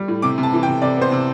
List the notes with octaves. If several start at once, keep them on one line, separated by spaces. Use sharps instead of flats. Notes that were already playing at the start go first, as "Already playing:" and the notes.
Already playing: G3
A2
C3 D6
C3
A5
E3
G5
C3
C3 D5
B3 C5
C3